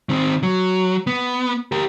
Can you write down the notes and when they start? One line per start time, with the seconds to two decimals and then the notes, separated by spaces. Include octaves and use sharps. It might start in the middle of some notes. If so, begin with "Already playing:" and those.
0.09 D#3 C4
0.43 F#3
1.07 B3
1.72 G4 A#4